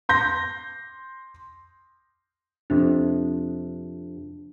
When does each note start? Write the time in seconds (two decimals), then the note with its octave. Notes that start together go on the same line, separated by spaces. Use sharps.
0.09 C6 G6 A#6
2.70 F2 C3 D4 A5